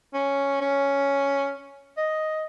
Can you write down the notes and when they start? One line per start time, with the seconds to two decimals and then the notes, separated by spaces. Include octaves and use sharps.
0.13 C#4
0.61 C#4
1.97 D#5